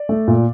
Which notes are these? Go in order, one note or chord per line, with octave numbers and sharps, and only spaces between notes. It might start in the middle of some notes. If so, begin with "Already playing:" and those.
Already playing: D5
A3
A#2